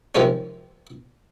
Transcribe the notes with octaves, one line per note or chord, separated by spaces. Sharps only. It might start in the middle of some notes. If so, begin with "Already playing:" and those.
C3 D#3 F3 G#3 C#4